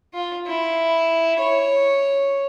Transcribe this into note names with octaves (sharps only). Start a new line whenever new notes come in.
F4
E4
C#5